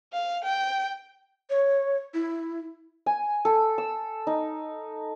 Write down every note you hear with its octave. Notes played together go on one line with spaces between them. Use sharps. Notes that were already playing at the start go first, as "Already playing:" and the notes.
F5
G5
C#5
E4
G#5
A4
E6
D#4